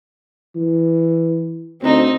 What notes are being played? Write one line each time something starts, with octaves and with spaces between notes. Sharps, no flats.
E3
D2 C4 D#4